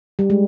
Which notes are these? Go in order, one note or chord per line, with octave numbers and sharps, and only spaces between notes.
G3
G#3